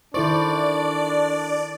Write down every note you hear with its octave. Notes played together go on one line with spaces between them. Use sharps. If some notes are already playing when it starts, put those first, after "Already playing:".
D#3 D4 E4 A4 C5 D5 C#6